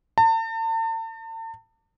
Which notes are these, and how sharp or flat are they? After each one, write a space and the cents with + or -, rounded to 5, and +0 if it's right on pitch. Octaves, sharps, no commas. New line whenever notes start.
A5 +40